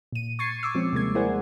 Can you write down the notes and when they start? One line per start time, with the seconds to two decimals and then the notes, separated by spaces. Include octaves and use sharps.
0.12 A#2 D#7
0.39 C#6 G#6 A6 C7 C#7
0.63 C#6 D6 E6
0.75 F3 G#3 C4 C#4
0.92 D#2 C3 G3 G#3 A#3 G#6
1.15 E4 G#4 A#4 C5 D5 F#5